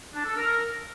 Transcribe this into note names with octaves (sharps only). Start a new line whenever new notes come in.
D4
A4
A#4